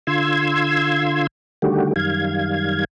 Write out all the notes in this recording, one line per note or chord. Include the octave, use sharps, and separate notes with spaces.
D3 F4 C6 E6 G#6
D3 D#3 G3 A3 F#4 G4
F#2 D#3 G3 F5 G#6